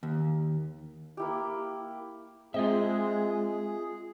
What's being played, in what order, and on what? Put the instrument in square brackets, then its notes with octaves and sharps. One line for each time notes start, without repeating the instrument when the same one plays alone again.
[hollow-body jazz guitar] D#2
[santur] A#3 E4 G4
[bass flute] G#3 [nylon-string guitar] C4 [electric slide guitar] F4 D#5 E5 [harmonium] G#4